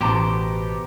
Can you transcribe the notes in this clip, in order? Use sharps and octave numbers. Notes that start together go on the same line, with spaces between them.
A1 B2 B3 G4 C5 A5 A#5 D6